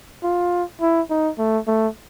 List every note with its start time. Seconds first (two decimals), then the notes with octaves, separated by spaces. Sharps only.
0.23 F4
0.81 E4
1.10 D#4
1.38 A3
1.67 A3